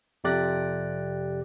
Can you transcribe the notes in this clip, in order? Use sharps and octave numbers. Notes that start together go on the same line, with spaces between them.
F2 C3 G4 D5 F#6 A#6